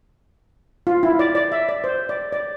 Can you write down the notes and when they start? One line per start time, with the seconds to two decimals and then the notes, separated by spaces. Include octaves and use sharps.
0.87 F4
1.03 E4
1.19 D5
1.35 D5
1.52 E5
1.69 D5
1.84 C5
2.09 D5
2.33 D5